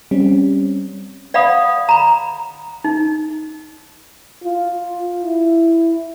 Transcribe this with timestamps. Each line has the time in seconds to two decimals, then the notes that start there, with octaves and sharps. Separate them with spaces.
0.11 G3 C4 C#4
1.34 D5 F5 F#5 B5 D#6
1.89 A#5 B5
2.84 D#4
4.44 F4
5.23 E4